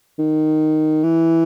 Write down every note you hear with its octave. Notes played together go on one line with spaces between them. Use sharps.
D#3
E3